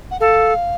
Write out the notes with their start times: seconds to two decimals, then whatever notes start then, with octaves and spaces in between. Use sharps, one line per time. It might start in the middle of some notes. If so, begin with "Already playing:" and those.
0.11 F#5
0.20 A4 F5